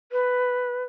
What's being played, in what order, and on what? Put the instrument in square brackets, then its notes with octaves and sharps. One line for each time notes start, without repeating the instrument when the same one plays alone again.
[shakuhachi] B4